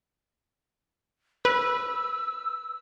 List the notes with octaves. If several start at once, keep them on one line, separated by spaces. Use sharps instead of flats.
B4 E6